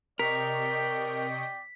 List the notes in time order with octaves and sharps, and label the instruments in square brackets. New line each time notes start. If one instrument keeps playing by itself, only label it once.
[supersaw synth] C3 D#5 C#6 [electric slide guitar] A#4 [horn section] D5 G5 [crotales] B6